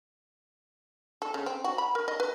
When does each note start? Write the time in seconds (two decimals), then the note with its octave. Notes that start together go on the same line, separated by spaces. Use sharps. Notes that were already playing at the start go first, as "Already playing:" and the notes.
1.22 A4
1.34 C#3
1.46 C4
1.64 F#4
1.78 B5
1.95 A#4
2.08 D#5
2.20 B4